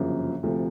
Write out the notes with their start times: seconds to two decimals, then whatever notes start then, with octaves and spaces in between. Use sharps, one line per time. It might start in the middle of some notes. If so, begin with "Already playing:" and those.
Already playing: G1 F#2 C#3 F3 A#3
0.43 D2 C3 F3 A3